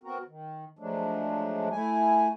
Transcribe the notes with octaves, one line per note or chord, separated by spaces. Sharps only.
B3 C4 F#4 A#4
D#3
F3 F#3 G#3 A3 D4
A3 E4 G#5